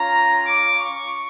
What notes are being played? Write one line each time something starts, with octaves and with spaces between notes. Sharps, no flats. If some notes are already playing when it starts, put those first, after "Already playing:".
Already playing: C#4 F4 A#5
D6
C#6